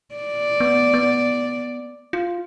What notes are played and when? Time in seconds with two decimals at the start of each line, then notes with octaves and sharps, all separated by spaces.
0.15 D5
0.60 B3
0.94 B3
2.13 F4